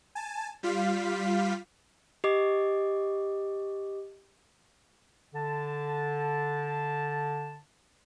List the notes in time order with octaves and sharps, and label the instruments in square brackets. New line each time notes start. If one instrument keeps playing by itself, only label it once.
[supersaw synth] G#5 A5
G3 F4 F5 B6
[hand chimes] G4 D#5 D6
[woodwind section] D3 A5